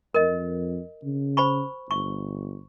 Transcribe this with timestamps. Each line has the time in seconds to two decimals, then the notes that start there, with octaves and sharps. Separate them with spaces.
0.14 F2 A#4 D#5
1.04 C#3
1.37 C5 B5 C#6
1.91 G1 C#6